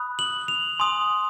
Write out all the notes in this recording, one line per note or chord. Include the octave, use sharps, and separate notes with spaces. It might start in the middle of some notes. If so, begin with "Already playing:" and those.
Already playing: B5 D#6 F#6
F#7
F7
G#5 C6 D#6